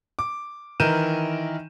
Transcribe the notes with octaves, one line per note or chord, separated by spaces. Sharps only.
D6
D#3 E3 A#4 G6 D#7 E7